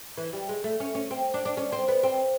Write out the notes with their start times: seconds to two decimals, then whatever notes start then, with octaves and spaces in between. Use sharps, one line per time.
0.17 E3
0.33 G3
0.49 G#3
0.64 A3
0.80 C#4
0.95 C#4
1.11 C4
1.34 D4
1.45 D4
1.57 C#4
1.72 C4
1.88 B3
2.03 C4